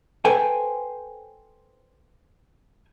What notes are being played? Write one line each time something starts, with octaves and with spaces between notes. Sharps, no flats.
A4 B4 C5 G5 G#5